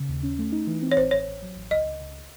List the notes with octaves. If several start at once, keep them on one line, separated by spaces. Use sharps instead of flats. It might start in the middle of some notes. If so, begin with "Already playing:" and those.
Already playing: C#3
D#2
C#4
A3
D#4
E3
C4
C#5
A1 C5
A1 C#5
A1
F#3
A1
C#2 D#5
C#2
C#2